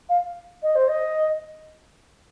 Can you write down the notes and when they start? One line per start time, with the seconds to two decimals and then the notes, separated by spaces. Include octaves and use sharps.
0.09 F5
0.63 D#5
0.75 C5
0.88 D#5